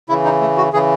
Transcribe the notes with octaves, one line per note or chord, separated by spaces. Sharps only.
C#3 E3 E4
D#4
A3
F#4
C#3 E3 G#4